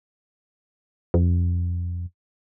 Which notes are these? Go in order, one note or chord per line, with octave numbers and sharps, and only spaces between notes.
F2